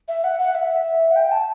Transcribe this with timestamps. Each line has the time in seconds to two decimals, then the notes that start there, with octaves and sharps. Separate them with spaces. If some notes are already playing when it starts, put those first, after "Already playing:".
0.08 E5
0.24 F#5
0.40 F#5
0.55 E5
1.11 F#5
1.16 G5
1.31 A5